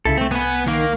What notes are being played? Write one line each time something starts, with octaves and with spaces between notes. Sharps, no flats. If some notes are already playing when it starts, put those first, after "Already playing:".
C2 C#3 E4 A4
A3 C4
B3 B4 G#5
D#3 A#3